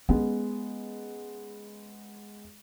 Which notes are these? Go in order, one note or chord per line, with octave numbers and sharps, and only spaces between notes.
G#3 B3 C#4